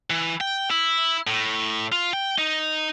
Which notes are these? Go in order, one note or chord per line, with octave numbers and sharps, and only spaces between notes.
E3
G5
E4
A2
F4
G5
D#4